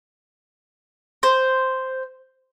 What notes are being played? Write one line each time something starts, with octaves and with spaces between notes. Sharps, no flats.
C5